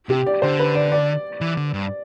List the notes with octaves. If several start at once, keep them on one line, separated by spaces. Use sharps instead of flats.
C3 G4
D5
D3 C5
B4
D5
D5
E3
D3
G2